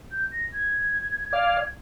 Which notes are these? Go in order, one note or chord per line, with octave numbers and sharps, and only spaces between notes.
G6
A#6
G#6
D5 F5